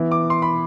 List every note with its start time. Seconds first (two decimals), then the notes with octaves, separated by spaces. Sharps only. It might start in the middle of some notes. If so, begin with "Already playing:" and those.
Already playing: E3 B3 E4
0.11 D6
0.30 C6
0.42 B5